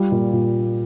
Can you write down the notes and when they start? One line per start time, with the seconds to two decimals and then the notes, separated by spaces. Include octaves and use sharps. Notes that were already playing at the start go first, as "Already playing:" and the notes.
Already playing: G3 F4
0.12 A#2
0.33 A#2